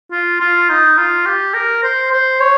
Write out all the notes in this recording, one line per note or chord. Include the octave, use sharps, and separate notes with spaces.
F4
F4
D#4
F4
G4
A#4
C5
C5
C#5